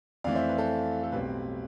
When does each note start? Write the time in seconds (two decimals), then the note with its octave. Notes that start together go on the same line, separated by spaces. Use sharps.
0.24 F2 E3 A3 D5 F5
0.35 C5 E5
0.49 B4
0.58 A4 C5
1.04 A4
1.12 B1 A2 G3 C4 B4